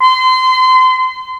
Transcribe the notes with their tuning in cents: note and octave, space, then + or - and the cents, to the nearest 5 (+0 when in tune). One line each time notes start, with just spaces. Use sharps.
C6 -30